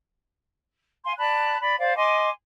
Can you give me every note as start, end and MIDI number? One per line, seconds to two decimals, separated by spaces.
1.04 1.13 77
1.04 1.13 80
1.04 1.13 84
1.17 1.58 74
1.17 1.58 81
1.17 1.58 83
1.17 1.58 90
1.60 1.77 74
1.60 1.77 83
1.78 1.96 72
1.78 1.96 74
1.78 1.96 77
1.96 2.29 75
1.96 2.29 80
1.96 2.29 84
1.96 2.29 86